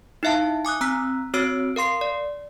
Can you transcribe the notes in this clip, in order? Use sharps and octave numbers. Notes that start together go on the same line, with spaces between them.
D#4 E4 E5 F5 A5
G#5 D6 D#6 F#6
C4 A#5 E6 F#6 B6
C4 F#4 C#5 E6 F6 D7
A#4 F5 C6 C7
D5